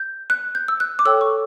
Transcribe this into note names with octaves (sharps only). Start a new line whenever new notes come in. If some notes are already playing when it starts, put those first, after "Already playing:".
Already playing: G6
F#6
G6
E6
F#6
D6
A4 C#5 G5 E6
C#6
D6